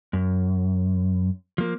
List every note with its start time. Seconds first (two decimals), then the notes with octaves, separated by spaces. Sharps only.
0.13 F#2
1.58 F3 A#3